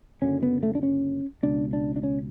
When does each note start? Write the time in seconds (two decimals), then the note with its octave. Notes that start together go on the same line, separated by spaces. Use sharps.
0.22 F#1 F#2 D3 C#4
0.43 B3
0.63 A3
0.75 D4
0.83 C#4
1.43 C#2 B2 D4
1.73 D4
1.96 D4
2.03 C#4